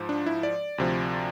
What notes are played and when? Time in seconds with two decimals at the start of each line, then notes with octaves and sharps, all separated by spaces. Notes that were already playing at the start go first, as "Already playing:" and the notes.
Already playing: G#2 F3
0.09 D4
0.26 E4
0.43 D5
0.78 D2 C3 F3